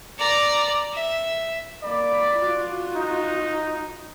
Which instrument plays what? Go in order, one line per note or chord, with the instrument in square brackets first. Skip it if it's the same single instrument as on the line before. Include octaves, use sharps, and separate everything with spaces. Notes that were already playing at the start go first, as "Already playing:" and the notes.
[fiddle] D5 A#5
E5
[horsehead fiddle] A#3 B5 [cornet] D5
[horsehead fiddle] F4 F#4
[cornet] D#4